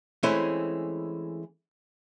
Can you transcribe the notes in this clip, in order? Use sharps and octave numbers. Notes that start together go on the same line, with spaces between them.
E3 G#3 A3 C4 C#4 E4